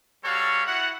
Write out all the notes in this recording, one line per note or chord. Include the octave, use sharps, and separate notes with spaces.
G3 F#4 A4 C#5 F5
E4 F#4 F#5